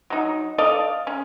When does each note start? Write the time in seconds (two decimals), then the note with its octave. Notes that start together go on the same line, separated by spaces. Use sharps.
0.10 F#3 D#4
0.58 A4 D5 D#5 F5
1.07 C#4